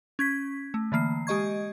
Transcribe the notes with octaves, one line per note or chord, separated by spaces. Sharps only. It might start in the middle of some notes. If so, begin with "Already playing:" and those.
C#4 G#6 B6
A3
D3 E3 A#3 C7
G#3 G4 D#5 C#6 G#6